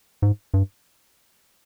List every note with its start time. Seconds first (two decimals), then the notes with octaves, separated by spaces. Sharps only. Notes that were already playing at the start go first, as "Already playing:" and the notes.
0.22 G#2
0.54 G2